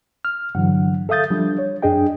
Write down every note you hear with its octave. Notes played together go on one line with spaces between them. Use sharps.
F6
G2 D3 E3 F#3 F#5
A4 E5 F5 D#6 G6 A6
F3 G3 D4
C#5
F#2 D4 G#4 D#5 G5